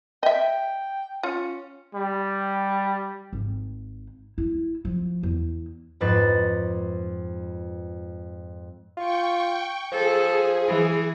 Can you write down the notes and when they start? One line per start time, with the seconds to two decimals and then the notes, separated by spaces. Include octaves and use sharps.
0.23 D#5 E5 G5
1.23 C#4 F4
1.95 G3
3.33 G#1
4.38 E4
4.85 F3
5.23 E2
6.01 F2 G#2 B4 A6 E7
8.97 F4 G5 C#6
9.92 F3 G#4 A4
10.68 E3